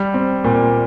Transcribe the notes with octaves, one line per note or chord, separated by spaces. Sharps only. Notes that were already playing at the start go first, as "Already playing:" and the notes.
Already playing: G3
C4
A#2